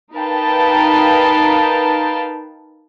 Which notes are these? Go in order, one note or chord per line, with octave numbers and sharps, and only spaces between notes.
D#4 A#4 B4 F5 G5 A5